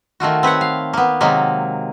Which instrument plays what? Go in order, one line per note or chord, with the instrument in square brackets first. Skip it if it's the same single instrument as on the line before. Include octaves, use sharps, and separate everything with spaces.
[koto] D#3 A3 F4 F#4
C4 B4 C#5 F#5
F5
A#3 B3
C3 D#3 F#3 G#3 A#3